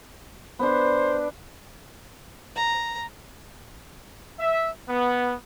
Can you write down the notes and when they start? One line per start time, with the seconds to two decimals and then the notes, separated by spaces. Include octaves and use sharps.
0.59 B3 D4 C5
2.55 A#5
4.39 E5
4.88 B3